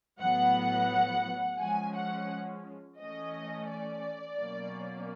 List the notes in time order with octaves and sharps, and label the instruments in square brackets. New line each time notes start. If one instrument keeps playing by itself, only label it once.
[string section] A2 F#3 B3 F#5
F3 G#3 C#4 G#5
F#5
E3 A3 C#4 D#5
D5
B2 F#3 A#3 C#4